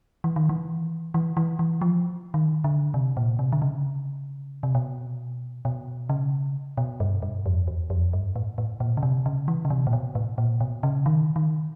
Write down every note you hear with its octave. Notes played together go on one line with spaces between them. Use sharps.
E3
D#3
E3
E3
E3
E3
F3
D#3
D3
C3
A#2
C3
D3
C#3
C3
B2
B2
C#3
B2
G2
G2
F2
E2
F2
G2
A2
A2
A#2
C#3
C3
C#3
E3
C#3
C3
A#2
B2
A2
A#2
B2
C#3
D#3
D#3